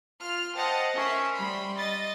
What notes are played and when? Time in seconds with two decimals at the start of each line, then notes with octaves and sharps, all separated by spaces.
0.21 F4 F6
0.56 C5 D#5 F#5 G5 A5
0.95 C#4 A#4 E5 C7
1.33 G3 B5 C6
1.75 D#5 A6